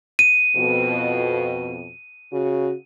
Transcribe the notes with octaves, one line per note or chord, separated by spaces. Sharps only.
D#7
F2 B2
C#3 F#4